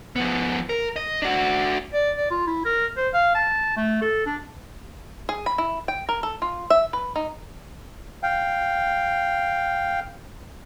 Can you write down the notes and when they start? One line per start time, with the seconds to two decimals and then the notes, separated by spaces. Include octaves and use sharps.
0.16 F3 B3
0.69 A#4
0.96 D#5
1.22 D4 F#4
1.93 D5
2.17 D5
2.31 F4
2.47 E4
2.65 A#4
2.97 C5
3.14 F5
3.35 A5
3.77 A3
4.01 A4
4.26 D4
5.29 G#4
5.46 B5
5.58 E4
5.88 G5
6.09 A#4
6.23 A4
6.42 F4
6.70 E5
6.93 B4
7.16 D#4
8.23 F5 G5